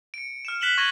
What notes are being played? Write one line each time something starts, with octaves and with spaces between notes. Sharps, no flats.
C#7 D7
F6 C#7 E7
F#6 B6 E7 F#7 G7
C#6 G#6 A#6 D#7 F#7 G7